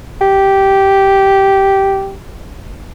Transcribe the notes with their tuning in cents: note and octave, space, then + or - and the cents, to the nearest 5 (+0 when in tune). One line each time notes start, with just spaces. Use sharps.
G4 -10